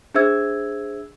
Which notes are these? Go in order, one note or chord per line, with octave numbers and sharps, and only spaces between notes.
D4 G#4 C5 E5 E6 G#6